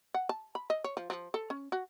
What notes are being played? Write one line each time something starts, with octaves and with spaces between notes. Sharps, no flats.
F#5
A5
B5
D#5
C#5
F3
F3
A4
C#4
F#4